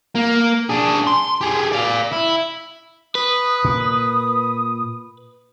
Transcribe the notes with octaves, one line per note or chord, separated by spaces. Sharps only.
A#3
D4 G#4
C6
G4 G#4
D5 F5
E4
B4 D#6
A#2